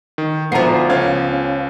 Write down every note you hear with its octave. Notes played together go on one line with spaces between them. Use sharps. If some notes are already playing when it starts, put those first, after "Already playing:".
D#3
D2 F3 B3 A#5 C7
C#2 C#4 F5 G#6
C#4